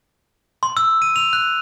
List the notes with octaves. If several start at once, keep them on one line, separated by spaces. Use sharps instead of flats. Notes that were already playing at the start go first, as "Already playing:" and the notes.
C6
E6
D#7
F7
F#6